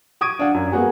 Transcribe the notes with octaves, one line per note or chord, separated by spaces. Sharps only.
C#6 D#6 G#6 D7 D#7
D4 F5 F#5
F#2
G#3 A#3 B3 F#4 G#4